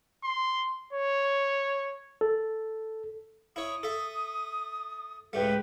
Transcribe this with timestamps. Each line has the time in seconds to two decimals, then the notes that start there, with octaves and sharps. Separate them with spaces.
0.24 C6
0.93 C#5
2.21 A4
3.56 E4 C#5 D#6
3.83 A4 E5
5.33 C#2 A2 A3 G4 B4